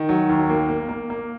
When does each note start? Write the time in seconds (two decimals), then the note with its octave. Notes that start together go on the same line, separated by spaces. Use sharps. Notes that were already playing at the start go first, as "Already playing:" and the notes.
Already playing: D#3
0.09 F#3
0.29 D#2
0.50 A#3
0.69 A#3
0.89 A#3
1.10 A#3